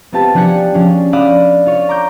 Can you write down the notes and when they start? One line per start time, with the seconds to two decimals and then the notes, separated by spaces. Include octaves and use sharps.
0.12 B3 C4 F4 G4 A5
0.34 F3 D4 G4 F#5 G#5 C#7
0.74 F3 C#4 D4 G#4
1.13 D5 F5 F#5 B5 D#6 E6
1.66 F4 C#5
1.89 A#5 D6 G6